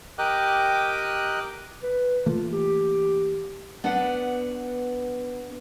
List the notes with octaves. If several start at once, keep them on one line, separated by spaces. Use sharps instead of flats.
G4 A#4 D#5 G5 D6 F#6
B4
E3 A3 A#3 F4
G4
B3 D4 B4 D5 F#5